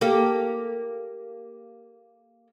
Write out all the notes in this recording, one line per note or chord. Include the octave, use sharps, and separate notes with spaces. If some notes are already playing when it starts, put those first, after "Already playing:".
A#3 G4 A4